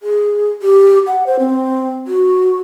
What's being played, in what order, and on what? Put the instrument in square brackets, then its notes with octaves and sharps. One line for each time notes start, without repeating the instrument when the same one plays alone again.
[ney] G#4
G4
F#5
C5
C4
F#4